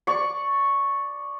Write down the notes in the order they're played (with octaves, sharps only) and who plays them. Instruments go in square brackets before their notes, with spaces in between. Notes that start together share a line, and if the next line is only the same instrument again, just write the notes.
[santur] D5 C#6